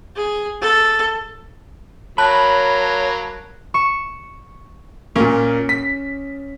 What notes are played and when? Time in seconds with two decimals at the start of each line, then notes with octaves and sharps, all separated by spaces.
0.16 G#4
0.61 A4
2.18 F#3 A#3 C#5 A5 B5 F#6
3.74 C#6 E7
5.16 A#2 A#3 C#4
5.69 B6